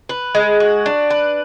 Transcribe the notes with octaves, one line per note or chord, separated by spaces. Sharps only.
B4
G#3
F#4
D4
B4